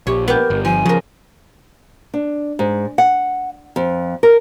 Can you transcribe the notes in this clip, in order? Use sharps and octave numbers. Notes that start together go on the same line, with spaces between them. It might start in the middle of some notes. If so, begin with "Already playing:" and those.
A#1 G4 C#5
B3 G4 A#4
G1
F3 G#5
C#3 F3 A#4
D4
G#2
F#5
F2
A#4